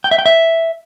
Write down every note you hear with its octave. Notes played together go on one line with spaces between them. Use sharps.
G5
E5
G5
E5